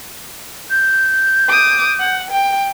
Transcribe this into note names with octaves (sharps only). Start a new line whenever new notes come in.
G6
D6 D#6
F#5
G5